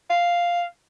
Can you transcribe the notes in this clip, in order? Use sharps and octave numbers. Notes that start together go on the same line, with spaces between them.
F5